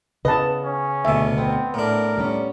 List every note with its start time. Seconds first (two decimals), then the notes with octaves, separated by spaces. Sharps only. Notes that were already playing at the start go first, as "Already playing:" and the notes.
0.25 C#3 B3 B4 D#5 A5
0.64 C#4
1.05 D2 B2 E5
1.38 B3 C4
1.74 A2 D4 A#4
2.17 G3 B3 C#4